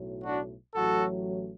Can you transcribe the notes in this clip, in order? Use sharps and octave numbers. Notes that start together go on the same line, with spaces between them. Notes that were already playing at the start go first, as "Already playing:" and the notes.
Already playing: B1 A2 F#3
D4 F#4
A1 A2 F#3 F#4 A4